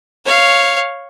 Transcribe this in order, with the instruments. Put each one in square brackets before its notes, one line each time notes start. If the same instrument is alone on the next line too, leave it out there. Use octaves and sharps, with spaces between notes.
[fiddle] C#5 F5